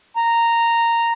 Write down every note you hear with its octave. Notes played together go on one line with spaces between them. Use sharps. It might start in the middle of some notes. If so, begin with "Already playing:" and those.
A#5